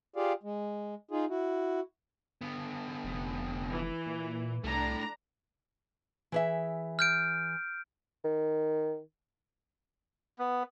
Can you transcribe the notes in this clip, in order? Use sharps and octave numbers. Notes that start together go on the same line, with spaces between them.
F4 G4 G#4 D5 F5
G#3
D#4 F4 G#4
E4 F#4
D3 B3
F1
E3
A#2
C2 A3 D4 E4 A#5
E3 G#4 E5
F6 G6 D7
D#3
B3